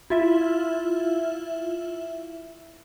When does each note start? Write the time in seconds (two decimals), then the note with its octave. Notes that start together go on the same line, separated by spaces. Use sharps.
0.10 E4 F4 E5